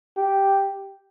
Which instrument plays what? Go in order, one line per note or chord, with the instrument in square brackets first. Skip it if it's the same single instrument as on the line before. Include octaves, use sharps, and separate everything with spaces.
[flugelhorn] G4